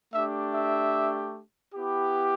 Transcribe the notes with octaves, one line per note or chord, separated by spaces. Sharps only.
A3 D4 G4 E5
E5
B3 E4 G4